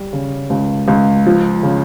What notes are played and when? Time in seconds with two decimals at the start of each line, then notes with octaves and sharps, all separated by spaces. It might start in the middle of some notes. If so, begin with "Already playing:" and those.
Already playing: G3
0.13 C#3
0.50 C#2
0.88 C#2
1.26 F3
1.63 C#3